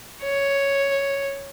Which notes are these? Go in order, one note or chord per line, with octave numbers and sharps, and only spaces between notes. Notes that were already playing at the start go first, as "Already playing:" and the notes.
C#5